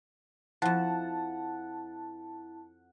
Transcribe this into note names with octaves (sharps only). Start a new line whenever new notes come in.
F2 F3 E4 F#5 A5